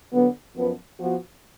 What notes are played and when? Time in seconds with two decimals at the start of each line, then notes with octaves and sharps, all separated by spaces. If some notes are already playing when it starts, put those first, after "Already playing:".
0.12 D3 F#3 B3
0.56 F#2 F3 B3
0.99 F3 B3 F#4